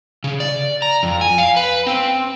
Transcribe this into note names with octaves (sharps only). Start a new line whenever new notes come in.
C#3
D5
A#5
F2
G#5
F5
B4
C4